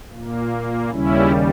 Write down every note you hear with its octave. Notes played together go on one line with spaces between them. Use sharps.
A#2 A#3
D#2 C#3 G3 C#4 E4